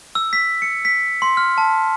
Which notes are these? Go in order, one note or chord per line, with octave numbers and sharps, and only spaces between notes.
E6
B6
C#7
B6
C6
F6
A5